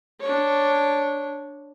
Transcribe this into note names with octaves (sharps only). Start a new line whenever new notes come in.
D4 C#5